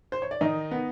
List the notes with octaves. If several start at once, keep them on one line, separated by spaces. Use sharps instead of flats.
C5
C#5
D5
D#3 D#4 D#5
B3